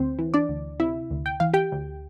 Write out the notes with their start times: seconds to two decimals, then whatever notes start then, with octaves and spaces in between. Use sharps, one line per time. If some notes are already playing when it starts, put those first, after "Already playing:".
Already playing: D2 C4 C5
0.19 E3
0.34 D4 D5
0.49 D2
0.80 C3 E4 E5
1.11 D2
1.26 G5
1.40 E3 F5
1.54 G4 G5
1.72 D2